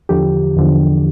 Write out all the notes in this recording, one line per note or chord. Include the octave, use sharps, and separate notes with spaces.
E2 D3 F3 G4
E2 D3 F3